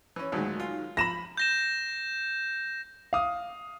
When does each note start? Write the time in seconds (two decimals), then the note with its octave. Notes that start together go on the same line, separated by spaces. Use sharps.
0.16 E3 C#4
0.32 D2 A#2 D#3 F#3 G#3
0.60 F4
0.97 F3 A#5 B5 A#6 E7
1.37 G6 A#6 E7
3.13 F5 D#6